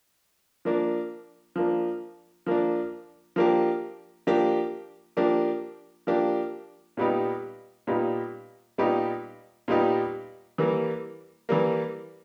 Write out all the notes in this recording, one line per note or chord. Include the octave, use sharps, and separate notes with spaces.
F3 A#3 D4
F3 A#3 D4
F3 A#3 D4
F3 A#3 D4 G4
F3 A#3 D4 G4
F3 A#3 D4 G4
F3 A#3 D4 G4
A#2 G3 B3 D#4 G4
A#2 G3 B3 D#4 G4
A#2 G3 B3 D#4 G4
A#2 G3 B3 D#4 G4
E3 G3 A#3
E3 G3 A#3